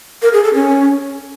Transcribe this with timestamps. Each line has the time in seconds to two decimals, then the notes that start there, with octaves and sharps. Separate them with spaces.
0.22 A#4
0.33 G#4
0.43 A4
0.54 C#4